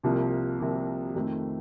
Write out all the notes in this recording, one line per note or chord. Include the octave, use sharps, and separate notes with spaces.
C2 C3 F3 A#3
C2 C3 F3 A#3
F2 D#3 A3 C4